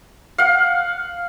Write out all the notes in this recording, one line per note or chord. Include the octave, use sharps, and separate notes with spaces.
F5 F#5